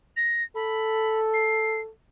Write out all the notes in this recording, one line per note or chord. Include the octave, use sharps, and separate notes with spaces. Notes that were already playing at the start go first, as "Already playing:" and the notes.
A#6
A4 B5
C7